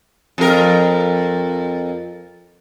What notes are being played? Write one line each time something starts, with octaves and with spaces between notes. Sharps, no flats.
F2 A#4